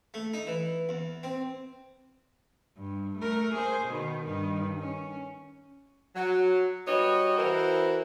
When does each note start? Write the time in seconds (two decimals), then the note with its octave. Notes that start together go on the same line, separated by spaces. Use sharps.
0.14 A3
0.34 D#4
0.47 E3
0.89 E2
1.23 C4
2.77 G2
3.19 A3 A#4
3.55 G#4 C5
3.87 B2 D#3
4.26 G2 D#3
4.79 C#4
6.15 F#3
6.87 G3 B3 F#4 C#5 D#5
7.38 E3 E4 F#4 A#4 C5